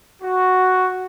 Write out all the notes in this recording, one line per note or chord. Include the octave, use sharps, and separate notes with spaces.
F#4